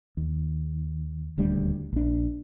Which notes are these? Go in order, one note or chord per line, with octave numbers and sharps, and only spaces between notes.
D#2
D#1 D2 G3 D4
A#1 D4